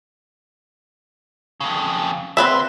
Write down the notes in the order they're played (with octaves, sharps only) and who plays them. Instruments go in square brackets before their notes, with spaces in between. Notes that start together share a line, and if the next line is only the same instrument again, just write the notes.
[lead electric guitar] F2 C#3
[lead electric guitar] D3 C6 [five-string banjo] C4 B4 E5